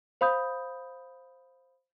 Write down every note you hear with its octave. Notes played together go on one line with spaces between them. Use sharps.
C5 F5 B5 D#6 G6